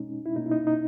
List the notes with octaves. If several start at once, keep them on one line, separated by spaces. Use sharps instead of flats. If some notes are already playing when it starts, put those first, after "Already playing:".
Already playing: B2 G#3 C#4 D#4
E4
B2 A#3 C#4 D#4
E4
D#4
D#4